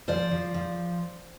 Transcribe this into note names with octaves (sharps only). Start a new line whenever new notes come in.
F3 C5 D5
F3
F3